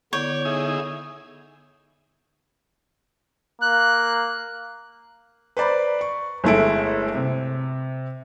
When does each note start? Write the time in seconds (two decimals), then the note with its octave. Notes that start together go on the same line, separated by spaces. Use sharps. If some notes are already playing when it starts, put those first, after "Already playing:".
0.13 D3 B3 E4 C#5 D5 C#6 G6
0.45 D#4 G#4 E5 D#6
3.62 A#3 F#6
5.57 B4 C5 D5 A#5 B5
6.01 C#6
6.44 G1 G#3 A3 E4 A4 D7
7.15 C3